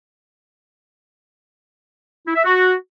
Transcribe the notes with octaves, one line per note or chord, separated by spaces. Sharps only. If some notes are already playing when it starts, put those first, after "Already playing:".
E4
E5
F#4